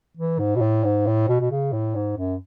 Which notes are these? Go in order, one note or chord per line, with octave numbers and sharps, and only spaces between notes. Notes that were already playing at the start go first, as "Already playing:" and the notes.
E3
G#2
B2
A2
G#2
A2
B2
B2
C#3
A2
G#2
F#2